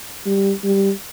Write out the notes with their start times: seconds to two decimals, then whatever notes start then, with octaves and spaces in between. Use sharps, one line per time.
0.26 G3
0.64 G3